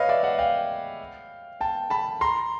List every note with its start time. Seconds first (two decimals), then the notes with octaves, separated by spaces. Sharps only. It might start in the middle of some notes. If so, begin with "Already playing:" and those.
Already playing: B4 C#5 D#5 F5
0.09 D5 E5
0.23 E5 F#5
0.39 F5 G5
1.61 G5 A5
1.90 A5 B5
2.21 A#5 C6